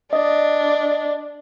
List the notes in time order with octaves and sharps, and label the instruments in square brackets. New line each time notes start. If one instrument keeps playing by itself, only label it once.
[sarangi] D4 [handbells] D5 D#5